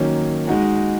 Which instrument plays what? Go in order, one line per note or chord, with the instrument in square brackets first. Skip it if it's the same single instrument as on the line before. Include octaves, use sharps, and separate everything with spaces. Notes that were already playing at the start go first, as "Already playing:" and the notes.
Already playing: [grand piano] D#3 F#3 A#3 C#4
G#3 D#4 F#4